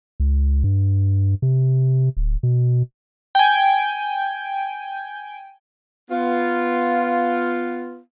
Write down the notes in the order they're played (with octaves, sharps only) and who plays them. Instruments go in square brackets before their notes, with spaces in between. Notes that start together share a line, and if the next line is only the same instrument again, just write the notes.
[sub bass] C#2
G2
C3
D1
B2
[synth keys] G5 G#5
[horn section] B3 F4